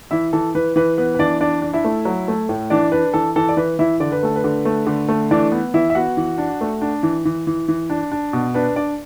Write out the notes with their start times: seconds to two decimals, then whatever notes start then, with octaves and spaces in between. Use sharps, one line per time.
0.11 E3 E4 E5
0.33 E3 A4
0.55 E3 B4
0.76 E3 B4
0.98 B3 B4
1.15 B4
1.19 E3 D4 D5
1.41 D4 D5
1.62 D4
1.73 E4 E5
1.84 A3
2.05 F#3
2.28 A3
2.49 A2
2.70 E3 D4 D5
2.92 D4 B4
3.14 E3 A4
3.36 E3 A4
3.49 D5
3.57 E3 B4
3.79 E3 E4 E5
4.00 D3 D5
4.12 B4
4.23 A3 A4
4.36 B4
4.44 D3
4.65 A3
4.87 D3
5.08 A3
5.31 E3 D4 D5
5.52 B3
5.74 E3 E4 E5
5.90 E5
5.95 B3 F#4 F#5
6.17 E3
6.38 D4
6.61 A3
6.82 D4
7.03 E3
7.25 E3
7.47 E3
7.68 E3
7.90 D4
8.12 D4
8.33 B2
8.54 D4 B4
8.76 D4 D5